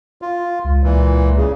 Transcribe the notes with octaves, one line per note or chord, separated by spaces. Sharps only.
F4
C#2
A#2 E3
C#3